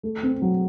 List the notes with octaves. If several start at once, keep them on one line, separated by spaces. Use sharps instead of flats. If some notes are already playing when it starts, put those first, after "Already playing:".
A3
C4
F#3